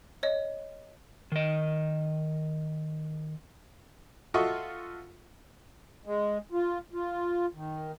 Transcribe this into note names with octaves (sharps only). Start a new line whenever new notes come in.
C#5 D#5
D#3 D#5
F4 F#4 A4 D#5 E5 C#6
G#3
F4
F4
D#3